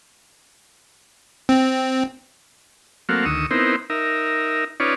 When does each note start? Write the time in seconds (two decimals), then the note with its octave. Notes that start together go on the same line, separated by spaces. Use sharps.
1.49 C4
3.09 F#3 A3 A#3 C4 F#4 F5
3.26 D2 D#3 C#6 D#6 E6
3.51 B3 C4 D#4 E4 A#4 C5
3.90 D#4 A#4 E5
4.80 C#4 D#4 F4 B4 C#5 D5